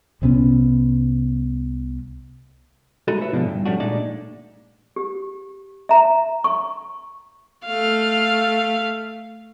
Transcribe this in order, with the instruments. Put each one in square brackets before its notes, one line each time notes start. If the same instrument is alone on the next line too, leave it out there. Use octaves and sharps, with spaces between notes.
[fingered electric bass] C2 C3 B3 C#4
[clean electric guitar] G#3 A3 D#4 E4 F#4 A4
E4 B4 C#5 E5
G#2 B2 D3 F3 G#3 D4
G2
F3 G3 A3 C#4 D4 F#4
A#2 G#3 A3 D4 D#4 D5
[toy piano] G4
E5 A#5
C#6
[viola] A3 F5